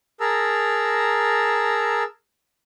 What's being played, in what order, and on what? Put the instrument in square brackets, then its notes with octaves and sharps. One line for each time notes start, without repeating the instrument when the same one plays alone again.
[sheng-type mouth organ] G#4 A#4 A5 A#5 E6